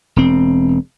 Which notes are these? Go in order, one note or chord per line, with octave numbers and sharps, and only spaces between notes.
E1 C4